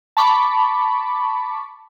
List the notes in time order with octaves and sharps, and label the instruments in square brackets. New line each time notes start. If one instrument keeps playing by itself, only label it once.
[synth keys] A5 B5 C#6 D6